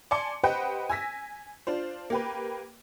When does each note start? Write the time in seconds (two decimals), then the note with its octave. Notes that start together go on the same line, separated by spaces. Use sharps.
0.11 D5 G#5 A5 C6 D6 C#7
0.43 G4 B4 C5 D#5 F#5 G5
0.89 G#5 E6 A#6 B6
1.67 D4 F4 C5
2.10 A#3 G4 B4